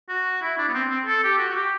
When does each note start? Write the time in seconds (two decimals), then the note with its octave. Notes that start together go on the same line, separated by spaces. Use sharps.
0.09 F#4
0.42 E4
0.58 D4
0.68 B3
0.74 C4
0.90 C4
1.06 A4
1.23 G4
1.39 F#4
1.50 F#4
1.56 G4